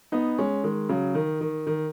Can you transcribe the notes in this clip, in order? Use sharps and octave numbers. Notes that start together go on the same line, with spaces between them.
B3 D#4
G#3 C#4
D#3 G#3
C#3 F#3
D#3
D#3
D#3